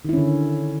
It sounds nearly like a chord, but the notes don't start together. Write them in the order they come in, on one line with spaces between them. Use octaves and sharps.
D#3 E4 C#4 D3